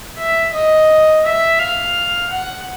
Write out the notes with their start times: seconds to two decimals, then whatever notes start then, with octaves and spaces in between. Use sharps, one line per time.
0.17 E5
0.53 D#5
1.24 E5
1.59 F5
2.30 F#5